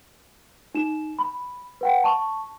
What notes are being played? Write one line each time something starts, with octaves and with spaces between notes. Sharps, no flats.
D#4 E7
B5
B4 F#5 G5
A5 C#6